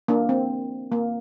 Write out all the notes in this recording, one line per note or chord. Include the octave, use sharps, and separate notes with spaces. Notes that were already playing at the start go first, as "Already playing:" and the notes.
A#3 D4
C4
A#3